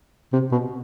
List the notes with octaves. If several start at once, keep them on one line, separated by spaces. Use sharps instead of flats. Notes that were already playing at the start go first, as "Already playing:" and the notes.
C3
B2